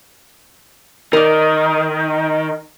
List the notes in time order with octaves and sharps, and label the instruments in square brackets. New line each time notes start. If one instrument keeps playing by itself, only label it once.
[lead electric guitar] D#3 [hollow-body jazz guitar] A#4 D5